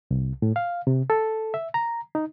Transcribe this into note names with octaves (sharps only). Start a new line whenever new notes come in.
C2
A2
F5
C3
A4
E5
A#5
D#4